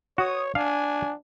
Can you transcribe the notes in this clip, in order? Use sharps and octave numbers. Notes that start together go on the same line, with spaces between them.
F#4 C#5 D#6
D4 F5 F#5 G#5